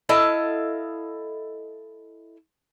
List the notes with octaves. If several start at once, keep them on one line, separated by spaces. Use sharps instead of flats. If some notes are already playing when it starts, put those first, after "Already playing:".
E4 A4 D#5 F5